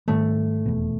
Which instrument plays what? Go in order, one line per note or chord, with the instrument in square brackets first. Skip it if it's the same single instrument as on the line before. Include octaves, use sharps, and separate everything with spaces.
[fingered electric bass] G#2 D#3 G3 [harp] A3
[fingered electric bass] F1 E2 B2